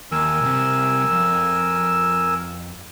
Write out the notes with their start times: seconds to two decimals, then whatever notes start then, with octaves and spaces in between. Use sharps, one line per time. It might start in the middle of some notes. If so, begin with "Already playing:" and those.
0.12 D#2 A#4 G#5 E6
0.42 C2 C3
1.11 F2